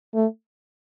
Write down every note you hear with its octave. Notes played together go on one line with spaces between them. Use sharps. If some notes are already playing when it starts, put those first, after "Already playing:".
A3